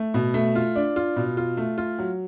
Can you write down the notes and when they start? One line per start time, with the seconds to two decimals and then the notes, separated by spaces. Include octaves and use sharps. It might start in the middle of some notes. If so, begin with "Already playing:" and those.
Already playing: A3
0.14 B2
0.34 A3
0.55 F4
0.75 D4
0.96 F4
1.16 B2
1.37 F4
1.57 A3
1.78 F4
1.98 F#3